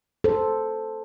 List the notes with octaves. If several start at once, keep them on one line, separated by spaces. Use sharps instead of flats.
A4 C5